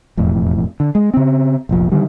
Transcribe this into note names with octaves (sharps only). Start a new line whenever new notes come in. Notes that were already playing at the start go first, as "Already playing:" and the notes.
E1 F2 A2
D3
G#3
C#3 C4
F1 A#1 F3
D3 D#3 G3